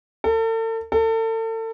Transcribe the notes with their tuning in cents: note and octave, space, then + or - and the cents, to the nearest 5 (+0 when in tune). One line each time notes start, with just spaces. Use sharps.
A4 +40
A4 +35